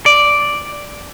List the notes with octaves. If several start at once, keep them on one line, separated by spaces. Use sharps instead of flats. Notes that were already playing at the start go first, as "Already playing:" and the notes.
D5